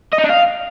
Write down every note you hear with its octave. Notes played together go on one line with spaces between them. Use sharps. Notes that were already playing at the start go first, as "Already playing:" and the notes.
D#5
D#4
D4
F5